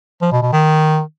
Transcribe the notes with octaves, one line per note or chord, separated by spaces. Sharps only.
F3
B2
B2
D#3